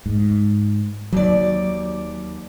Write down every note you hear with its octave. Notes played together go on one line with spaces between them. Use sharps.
G#2
D#2 F#3 D5